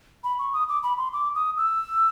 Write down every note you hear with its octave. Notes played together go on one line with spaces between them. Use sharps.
B5
C#6
D#6
D6
B5
C6
D6
D#6
E6